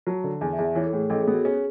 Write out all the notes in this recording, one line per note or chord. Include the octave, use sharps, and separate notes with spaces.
F#3 A5
D3
E2 G#5
E5
E2
E5
E3 C#5
A4
A2 G#4
A1 A4
G#4
B3 F#4
C#4 G#4